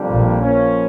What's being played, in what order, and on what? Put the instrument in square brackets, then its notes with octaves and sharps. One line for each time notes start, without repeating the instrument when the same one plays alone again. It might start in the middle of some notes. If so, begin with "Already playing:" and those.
Already playing: [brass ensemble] F2 D3 G3 A#3 D4
[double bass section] A#1 A#2
[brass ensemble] F3 A#3 C#4